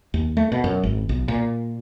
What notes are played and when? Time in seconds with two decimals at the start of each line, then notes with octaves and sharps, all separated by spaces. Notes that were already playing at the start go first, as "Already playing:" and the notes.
0.14 D#2
0.37 A3
0.52 B2
0.64 F#2
0.83 G#1
1.09 B1
1.28 A#2